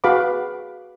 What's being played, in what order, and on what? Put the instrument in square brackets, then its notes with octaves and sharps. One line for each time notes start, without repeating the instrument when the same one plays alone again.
[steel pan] F#4 G#4 B4 F5 B5 D6